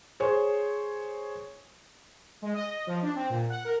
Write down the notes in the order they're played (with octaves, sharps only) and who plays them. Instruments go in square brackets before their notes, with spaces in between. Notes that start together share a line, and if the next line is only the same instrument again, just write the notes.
[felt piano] G#4 C5 C#5
[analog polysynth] G#3
D#5
F3
D4
C4
A#2
F#5
A#4